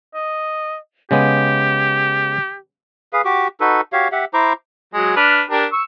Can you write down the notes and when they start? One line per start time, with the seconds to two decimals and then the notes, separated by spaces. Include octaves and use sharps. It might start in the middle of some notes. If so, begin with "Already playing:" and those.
0.14 D#5
1.11 C#3 G#3 B3 G4
3.13 G#4 B4 F5
3.25 F#4 G4 D6
3.60 D#4 F#4 A4 B4
3.93 F#4 G4 C#5 F5
4.12 G4 E5 F#5
4.34 E4 C5 A#5 D6
4.94 F#3 G#3
5.17 D4 B4 F6
5.51 D4 G4 A#4
5.73 C#6 E6